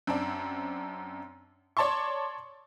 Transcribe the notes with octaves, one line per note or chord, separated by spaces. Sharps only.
F#2 C4 D4
C#5 D5 A5 C6 C#6